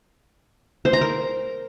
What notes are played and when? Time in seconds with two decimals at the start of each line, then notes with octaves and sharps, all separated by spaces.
0.85 C5
0.93 A#5
1.01 A#4